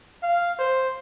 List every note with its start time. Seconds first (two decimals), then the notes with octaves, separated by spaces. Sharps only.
0.23 F5
0.59 C5